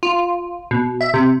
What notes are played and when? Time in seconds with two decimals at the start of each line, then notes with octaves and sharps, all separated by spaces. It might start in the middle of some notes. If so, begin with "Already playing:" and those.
0.03 F4
0.71 B2
1.01 E5
1.14 C3